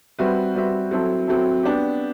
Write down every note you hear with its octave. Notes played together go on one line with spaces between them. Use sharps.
G3 C4 F#4 B4 E5
G3 C4 F#4 B4 E5
F#3 C4 E4 A4
F#3 C4 E4 A4
B3 D4 G4